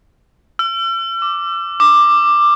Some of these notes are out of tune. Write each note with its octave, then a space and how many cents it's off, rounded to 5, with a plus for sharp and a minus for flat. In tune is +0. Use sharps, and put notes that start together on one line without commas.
E6 +45
D6 +0
D6 +10